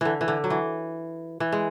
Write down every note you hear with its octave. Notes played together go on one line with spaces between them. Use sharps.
D3 E3
E3
D3
F#3
E3
E3
G#3